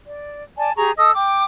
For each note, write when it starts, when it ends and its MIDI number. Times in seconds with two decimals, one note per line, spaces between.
0.07 0.42 74
0.57 0.71 74
0.57 0.71 80
0.57 0.71 81
0.76 0.91 67
0.76 0.91 68
0.76 0.91 82
0.76 0.91 85
0.97 1.11 69
0.97 1.11 75
0.97 1.11 87
0.97 1.11 88
1.14 1.42 79
1.14 1.42 86